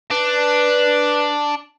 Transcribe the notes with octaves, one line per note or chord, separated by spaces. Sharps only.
D4 B4